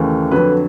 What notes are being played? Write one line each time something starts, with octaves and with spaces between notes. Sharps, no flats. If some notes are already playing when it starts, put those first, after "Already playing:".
Already playing: D#2 C#3 E3 A3
F2 D3 F#3 B4